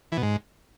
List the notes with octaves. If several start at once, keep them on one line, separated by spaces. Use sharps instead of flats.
E3
B2
G#2